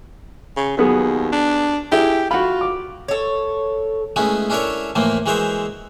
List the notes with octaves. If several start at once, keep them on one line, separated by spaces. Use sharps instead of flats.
C#3
D#2 F#3 B3 G#4
D4
E4 G4 G#4
F4 F#4 B5
D6
A4 C#5
G#3 A3 B3 C#4 E4
C#4 D4 E4 A4 A#4 C#5
A2 E3 F3 A3 A#3
E3 G#3 F#4 A#4 C5 E5